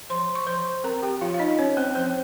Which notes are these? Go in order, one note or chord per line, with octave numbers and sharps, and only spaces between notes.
F3 C5 C6
C#6
F3 C5 C6
C4 A#4 A#5
G4 G5
F3 F4 F5
F5
D#4 D#5
C#4 C#5
C4 C5
F3 C4 C5